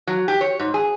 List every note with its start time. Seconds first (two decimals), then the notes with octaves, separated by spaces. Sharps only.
0.07 F#3
0.28 G4
0.41 C#5
0.60 G#2
0.74 G#4